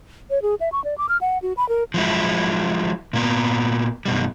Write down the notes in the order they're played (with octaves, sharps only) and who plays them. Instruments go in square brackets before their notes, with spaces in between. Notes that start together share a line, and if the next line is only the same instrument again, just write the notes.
[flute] C#5
G#4
E5
C#6
D5
D6
F6
F#5
F#4
B5
A#4
[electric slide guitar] F3 F#3 G#3 E4
A#2 A#3 B3
F#2 B2 G3